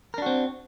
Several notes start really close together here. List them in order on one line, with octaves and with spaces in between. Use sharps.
A#4 D4 F#4 C4